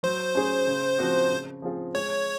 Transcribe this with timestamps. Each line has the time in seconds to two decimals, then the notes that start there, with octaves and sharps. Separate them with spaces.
0.03 F#3 C5
0.35 C#4 G#4
0.67 C#3
0.99 F3 C4 F#4
1.30 C#3
1.62 F3 C4 F4 G#4
1.94 G#3 C#5